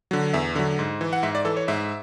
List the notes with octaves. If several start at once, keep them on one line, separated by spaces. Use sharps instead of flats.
D3 F#3
E2 E5
D3 F#3
G#2
E3
F#5
G#2 E5
D5
E3 A4
C#5
G#2 E5